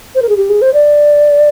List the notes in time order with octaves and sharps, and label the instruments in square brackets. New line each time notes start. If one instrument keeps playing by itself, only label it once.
[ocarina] C5
A#4
G#4
G4
G#4
C5
D5